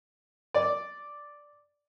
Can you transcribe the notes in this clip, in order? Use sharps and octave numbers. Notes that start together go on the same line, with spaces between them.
D5